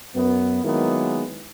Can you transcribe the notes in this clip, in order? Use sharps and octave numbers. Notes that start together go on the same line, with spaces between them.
F#2 B3
D#3 F#3 G#3 A#3 B3 E4